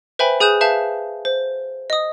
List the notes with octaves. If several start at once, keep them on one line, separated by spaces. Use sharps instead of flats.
B4 C5 E5 G5 G#5 B5
G#4 G#5 D#6 F#6 G6 E7
B4 E5 F5 A5 G6 E7
C5
D#5 D#6